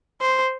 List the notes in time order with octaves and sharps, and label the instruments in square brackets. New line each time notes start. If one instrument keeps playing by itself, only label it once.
[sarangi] C5